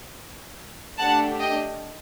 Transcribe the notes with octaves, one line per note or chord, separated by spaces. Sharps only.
A3 D4 G4 F#5 A5
D#5 G5